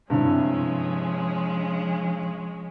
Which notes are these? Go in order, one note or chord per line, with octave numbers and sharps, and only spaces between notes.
G2 C3 F3 G#3 C#4 E4